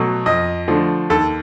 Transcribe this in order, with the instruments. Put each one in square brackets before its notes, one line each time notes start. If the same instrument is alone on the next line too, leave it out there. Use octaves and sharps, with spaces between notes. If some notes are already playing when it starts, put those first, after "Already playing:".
Already playing: [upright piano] B2 F#3 A3
F2 D#5
D3 F3 A3
D#2 A4